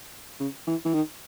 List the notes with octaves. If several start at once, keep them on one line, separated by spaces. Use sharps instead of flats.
C#3
E3
E3
D#3